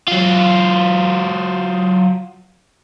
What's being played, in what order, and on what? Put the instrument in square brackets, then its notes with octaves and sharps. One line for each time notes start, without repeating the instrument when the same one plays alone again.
[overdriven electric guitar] F#3 F4